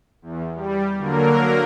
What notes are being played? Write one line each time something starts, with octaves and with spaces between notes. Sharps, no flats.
E2
G3
D3 F#3 A#3 A#4